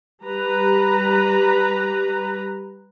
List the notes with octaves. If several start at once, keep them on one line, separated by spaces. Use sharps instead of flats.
G3 B4 A#5